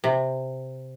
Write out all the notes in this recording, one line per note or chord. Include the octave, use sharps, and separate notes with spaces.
C3